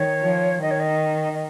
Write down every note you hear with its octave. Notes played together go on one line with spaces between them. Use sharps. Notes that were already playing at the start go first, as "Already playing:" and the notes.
Already playing: D#3 C#5
F3
D#3 D#5
C#5
D#5
D#5